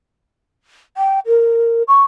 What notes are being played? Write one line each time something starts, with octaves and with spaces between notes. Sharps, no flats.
G5
A#4
C#6